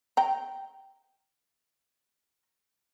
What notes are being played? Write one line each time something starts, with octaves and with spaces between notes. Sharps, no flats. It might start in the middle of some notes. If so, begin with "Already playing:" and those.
G5 A#5